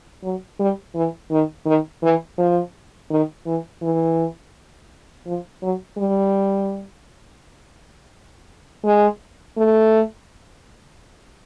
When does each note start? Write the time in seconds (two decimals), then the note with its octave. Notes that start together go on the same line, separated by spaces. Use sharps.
0.23 F#3
0.59 G3
0.95 E3
1.31 D#3
1.66 D#3
2.03 E3
2.38 F3
3.10 D#3
3.46 E3
3.82 E3
5.26 F3
5.62 F#3
5.97 G3
8.85 G#3
9.57 A3